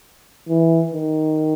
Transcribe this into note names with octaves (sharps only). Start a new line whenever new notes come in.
E3
D#3